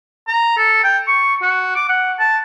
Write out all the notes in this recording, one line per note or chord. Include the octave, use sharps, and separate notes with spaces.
A#5
A4
G5
C#6
F#4
D6
F#5
A5